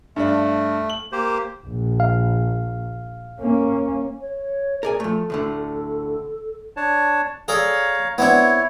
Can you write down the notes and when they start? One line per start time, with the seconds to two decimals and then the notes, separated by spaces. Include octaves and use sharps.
0.16 G2 A3 D4
0.90 F#7
1.12 A#3 G4 C5
1.66 A#1
2.00 F5
3.40 A#3 C#4
4.21 C#5
4.83 G#4 A#4 D5 G#5
5.00 F3 A3 A4
5.30 D2 A2 D3
6.76 D4 C#5 A5
7.48 G#4 A4 C#5 D5 F5 A#5
8.18 B3 C4 D4 E4 C#5